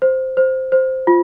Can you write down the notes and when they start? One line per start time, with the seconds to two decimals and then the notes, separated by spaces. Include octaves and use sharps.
0.02 C5
0.37 C5
0.72 C5
1.07 F4